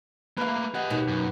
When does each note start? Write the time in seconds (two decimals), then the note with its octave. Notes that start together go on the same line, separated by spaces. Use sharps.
0.38 A3 A#3 B4 F5
0.75 G4 D#5 F#5
0.90 D#2 B2 D#3
1.08 F#2